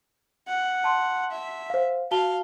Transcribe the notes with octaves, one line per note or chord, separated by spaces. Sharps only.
F#5
A5 C6
E5
C5 F5
F#4 F5 A5 G7